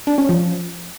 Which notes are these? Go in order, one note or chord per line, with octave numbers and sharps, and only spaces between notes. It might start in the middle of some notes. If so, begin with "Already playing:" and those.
D4
C#4
F3